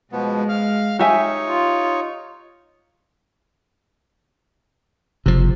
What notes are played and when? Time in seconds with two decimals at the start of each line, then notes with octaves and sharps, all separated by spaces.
0.12 B2 F3 G#3 B3
0.49 F5 F6
0.99 D#4 G4 C#5 E5 G#5
1.48 F4
5.26 F#1 C3 F3